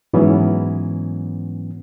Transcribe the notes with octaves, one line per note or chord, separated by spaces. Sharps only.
G#2 E3 F#3 B3 C#4